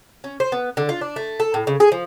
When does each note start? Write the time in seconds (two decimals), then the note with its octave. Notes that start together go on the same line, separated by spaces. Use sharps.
0.24 C#4
0.40 C5
0.52 B3
0.77 D3
0.89 F4
1.01 D4
1.16 A3
1.40 A4
1.54 A2
1.67 C#3
1.80 G#4
1.92 F3